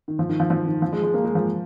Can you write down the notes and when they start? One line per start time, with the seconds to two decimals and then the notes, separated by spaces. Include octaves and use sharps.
0.08 D#3
0.19 F3
0.29 D#3
0.40 F3
0.50 F3
0.66 D#3
0.82 F3
0.93 G#3
1.03 G#3
1.14 A#3
1.25 G#3
1.35 F3